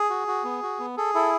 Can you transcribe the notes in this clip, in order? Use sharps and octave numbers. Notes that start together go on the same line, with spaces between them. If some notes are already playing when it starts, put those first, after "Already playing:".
Already playing: G#4
F#4
F#4
B3
F#4
B3
G#4 A4
E4 A4